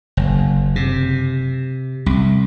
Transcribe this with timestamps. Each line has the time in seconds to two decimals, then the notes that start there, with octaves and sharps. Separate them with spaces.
0.17 F#1
0.76 C3
2.06 C2